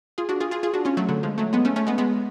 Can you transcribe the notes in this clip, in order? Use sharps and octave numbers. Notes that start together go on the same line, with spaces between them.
F4 G#4
D4 F#4
F4 G#4
F4 G#4
F4 G#4
D4 F#4
C#4 F4
F#3 A3
D3 F#3
F3 G#3
F#3 A3
G#3 B3
A3 C#4
A3 C#4
G#3 B3
G#3 B3